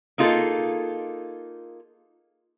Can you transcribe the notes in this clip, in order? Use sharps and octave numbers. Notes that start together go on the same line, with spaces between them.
A#3 D#4 F4 G#4 A4